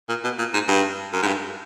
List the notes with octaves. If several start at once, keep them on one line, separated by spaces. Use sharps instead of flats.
A#2
B2
A#2
G#2
G2
F#2
G#2
G2